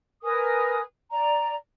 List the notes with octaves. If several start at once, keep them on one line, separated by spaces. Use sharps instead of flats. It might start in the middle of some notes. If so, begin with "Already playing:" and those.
A#4 B4 G#5 D#6
D5 A#5